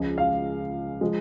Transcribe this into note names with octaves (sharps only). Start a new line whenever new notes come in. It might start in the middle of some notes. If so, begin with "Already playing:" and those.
Already playing: C#2 C#3 F3 G#3
F5
F3 G#3